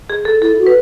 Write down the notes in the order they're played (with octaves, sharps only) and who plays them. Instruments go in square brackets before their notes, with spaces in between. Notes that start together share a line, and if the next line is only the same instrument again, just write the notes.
[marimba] G#4
A4
[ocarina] E4 [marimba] A4
[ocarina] F#4
[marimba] B4